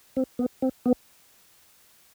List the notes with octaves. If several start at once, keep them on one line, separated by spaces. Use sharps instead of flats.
C4
B3
C4
B3